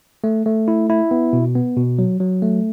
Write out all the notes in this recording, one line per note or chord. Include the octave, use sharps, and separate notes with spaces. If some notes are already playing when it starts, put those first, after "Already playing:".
A3
A3
E4
E4
B3
B2
B3
B2
F#3
F#3
A3